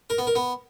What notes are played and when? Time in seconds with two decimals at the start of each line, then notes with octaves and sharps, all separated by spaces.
0.10 A#4
0.18 B3
0.27 A#4
0.36 B3